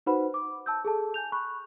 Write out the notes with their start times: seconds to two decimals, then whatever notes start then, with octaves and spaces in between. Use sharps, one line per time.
0.06 D#4 F#4 B4 C5 F#5 B5
0.34 D6
0.66 A5 E6 G6
0.85 G#4 A4 A5
1.14 G#5 G6 F7
1.32 B5 C#6 F#6